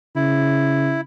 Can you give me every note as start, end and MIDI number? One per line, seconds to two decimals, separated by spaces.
0.16 1.01 49
0.16 1.01 64